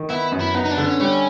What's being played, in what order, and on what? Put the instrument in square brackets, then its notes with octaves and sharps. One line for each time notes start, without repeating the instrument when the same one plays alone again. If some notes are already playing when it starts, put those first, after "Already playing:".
Already playing: [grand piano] D#3
[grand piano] B3 [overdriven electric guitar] E4
[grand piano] F#2
[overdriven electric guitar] E4
[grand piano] B3 [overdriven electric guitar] D#4
[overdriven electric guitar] D#4
D4
[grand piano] D3
[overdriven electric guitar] C#4
[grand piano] G3 [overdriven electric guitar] C#4